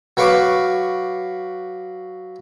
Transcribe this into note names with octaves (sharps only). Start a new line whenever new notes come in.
F#3 B4 F5 C#6 D6